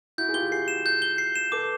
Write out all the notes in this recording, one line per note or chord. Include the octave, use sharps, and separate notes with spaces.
E4 F#4 G6
G#4
F4 G4 G7
F#4 G#4 C7
E7
G6
G7
C7
E7
A4 B4 D6